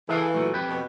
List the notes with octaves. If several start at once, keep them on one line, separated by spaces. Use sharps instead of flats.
E3 G#4 A4 F5
A#2 F#3 A3
F2 G4 B4
B2